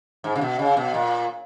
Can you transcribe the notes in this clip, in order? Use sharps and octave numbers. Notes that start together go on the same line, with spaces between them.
G#2
C#3
B2
C#3
B2
A#2